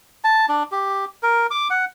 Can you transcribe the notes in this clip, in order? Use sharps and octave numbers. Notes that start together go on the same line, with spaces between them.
A5
D4
G4
A#4
D6
F#5